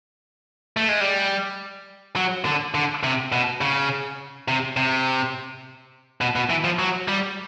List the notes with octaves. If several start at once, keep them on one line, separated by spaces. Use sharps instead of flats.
A3
G#3
G3
F#3
D3
D3
C3
B2
C#3
C3
C3
B2
B2
E3
F3
F#3
G3